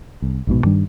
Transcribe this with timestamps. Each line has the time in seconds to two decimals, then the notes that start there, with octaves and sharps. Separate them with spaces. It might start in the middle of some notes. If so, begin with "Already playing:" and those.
0.22 C2
0.47 A#1 G#2 B2
0.64 G2 D#3 G3 D4